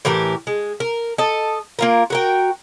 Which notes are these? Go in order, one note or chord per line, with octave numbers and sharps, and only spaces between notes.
A2 E3 G4 A#4
G#3
A#4
A4 D#5
A#3 F4 A#4
F#4 A#4 G5